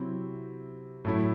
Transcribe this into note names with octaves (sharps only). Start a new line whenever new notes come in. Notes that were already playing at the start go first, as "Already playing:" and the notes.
Already playing: C3 F#3 C4 E4
A2 F#3 A3 E4